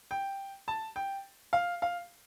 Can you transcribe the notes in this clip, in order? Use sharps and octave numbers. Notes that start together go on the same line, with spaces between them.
G5
A5
G5
F5
F5